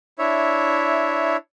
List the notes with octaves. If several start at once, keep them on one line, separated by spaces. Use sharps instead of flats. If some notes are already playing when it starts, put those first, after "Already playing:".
D4 E4 C#5 E5